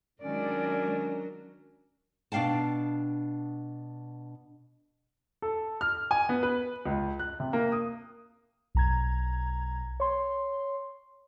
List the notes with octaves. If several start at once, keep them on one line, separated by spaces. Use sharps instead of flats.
D#3 F#3 G#3 C#4 D4 A#4 D5
B2 D4 F5 G5 A5
A4
F6
G#5
B3
B4
C#2
F#6
C3
A#3
D#6
B1 A#5 G#6
C#5 C6